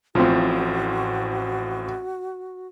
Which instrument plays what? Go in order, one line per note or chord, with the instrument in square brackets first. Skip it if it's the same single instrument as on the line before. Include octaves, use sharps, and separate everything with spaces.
[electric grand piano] A1 A2 [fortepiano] F3 C4 [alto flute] F#4